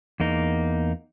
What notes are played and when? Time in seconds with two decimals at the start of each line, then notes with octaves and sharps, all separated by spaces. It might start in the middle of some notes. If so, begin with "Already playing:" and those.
0.20 E2 A#3 D#4